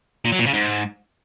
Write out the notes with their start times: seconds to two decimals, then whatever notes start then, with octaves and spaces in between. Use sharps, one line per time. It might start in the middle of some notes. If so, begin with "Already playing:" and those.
0.25 A#2
0.32 F#3
0.39 A#2
0.46 C#3
0.53 G#2